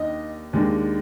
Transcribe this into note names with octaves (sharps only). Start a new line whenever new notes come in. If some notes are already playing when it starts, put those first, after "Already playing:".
Already playing: D#2 D#3 D4 D#5
D#2 D#3 G#3 D4